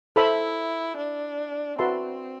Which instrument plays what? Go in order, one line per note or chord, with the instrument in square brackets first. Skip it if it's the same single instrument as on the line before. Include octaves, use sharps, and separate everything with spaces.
[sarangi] E4 [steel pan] A4 C5 E5 B5
[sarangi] D4
[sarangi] C4 [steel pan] F#4 B4 E5 A5 C6